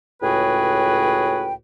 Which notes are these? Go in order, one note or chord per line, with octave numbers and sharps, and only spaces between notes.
C#2 A2 F#4 G#4 B4 G5